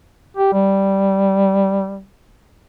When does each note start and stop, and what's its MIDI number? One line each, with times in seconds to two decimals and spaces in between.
0.37 0.53 67
0.53 2.03 55